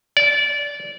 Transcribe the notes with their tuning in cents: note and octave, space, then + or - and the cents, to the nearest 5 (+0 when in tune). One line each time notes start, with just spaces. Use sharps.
D5 -20